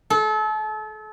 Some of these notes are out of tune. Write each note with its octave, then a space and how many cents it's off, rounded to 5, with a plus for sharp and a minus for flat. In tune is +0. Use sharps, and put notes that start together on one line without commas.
A4 -35